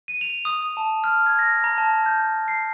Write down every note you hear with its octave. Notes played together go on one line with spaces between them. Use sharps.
D#7
F7
D#6
A5
F6
G#6
A#6
A#5
A5
G6
C7